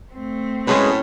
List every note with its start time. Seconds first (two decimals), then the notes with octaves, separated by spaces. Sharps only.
0.13 A3 C4
0.67 F#2 A2 G#3 C#4 G#4 B4